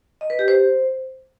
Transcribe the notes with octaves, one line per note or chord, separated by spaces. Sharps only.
D#5
B4
G4
C5